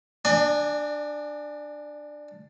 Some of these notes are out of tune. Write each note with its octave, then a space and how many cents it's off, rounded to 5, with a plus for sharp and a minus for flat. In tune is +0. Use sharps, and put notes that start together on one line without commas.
D4 +10 D5 +45 G#5 +0